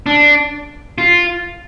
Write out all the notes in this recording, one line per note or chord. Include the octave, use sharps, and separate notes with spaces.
D4
F4